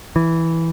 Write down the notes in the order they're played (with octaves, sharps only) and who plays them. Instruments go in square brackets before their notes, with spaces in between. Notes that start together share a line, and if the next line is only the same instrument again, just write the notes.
[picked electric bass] E3